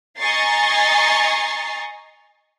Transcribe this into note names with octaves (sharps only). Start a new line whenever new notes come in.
D#5 G#5 A#5 C#6 A6 C7